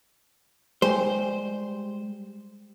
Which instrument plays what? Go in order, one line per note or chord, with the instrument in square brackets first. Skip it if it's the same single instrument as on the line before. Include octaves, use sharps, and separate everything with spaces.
[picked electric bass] G3 G#3 [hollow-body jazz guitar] C5